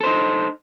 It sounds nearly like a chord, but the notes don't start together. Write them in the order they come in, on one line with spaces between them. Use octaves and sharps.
A4 C5 D#4